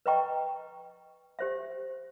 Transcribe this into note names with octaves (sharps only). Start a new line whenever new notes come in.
B4 D#5 G5 A#5 C#6
G4 C5 E5